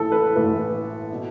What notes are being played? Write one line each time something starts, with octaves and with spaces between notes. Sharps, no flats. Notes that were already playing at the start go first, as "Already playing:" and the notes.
Already playing: A1 A2 E3 A4
B4
A1 A2 E3 B4
B2